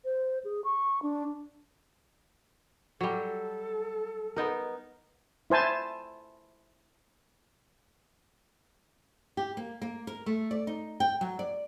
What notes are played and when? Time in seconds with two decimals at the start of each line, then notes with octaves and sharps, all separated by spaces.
0.05 C5
0.44 G#4
0.64 C#6
1.02 D4
3.01 F#3 G3 A4
4.36 B3 D#4 A#4
5.50 E4 C5 G#5 A5
9.37 G4
9.57 A#3
9.82 A#3
10.07 A#4
10.26 A3
10.51 D5
10.67 D#4
11.00 G5
11.21 F#3
11.39 D5